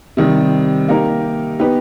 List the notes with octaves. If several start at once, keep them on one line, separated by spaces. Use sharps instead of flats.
C3 D#3 G3
A#3 D#4 G4 A#4
B3 D#4 G4 B4